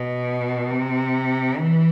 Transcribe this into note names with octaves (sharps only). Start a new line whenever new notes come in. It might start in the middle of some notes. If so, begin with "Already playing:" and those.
Already playing: B2
C3
E3